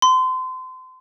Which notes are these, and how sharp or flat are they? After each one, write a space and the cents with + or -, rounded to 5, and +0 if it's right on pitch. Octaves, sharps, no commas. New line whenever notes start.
C6 -30